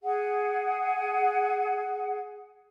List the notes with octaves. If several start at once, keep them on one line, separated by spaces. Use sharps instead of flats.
G#4 F#5